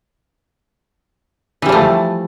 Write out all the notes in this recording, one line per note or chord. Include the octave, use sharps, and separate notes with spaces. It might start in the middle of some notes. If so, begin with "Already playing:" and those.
E3 F3 G3 A3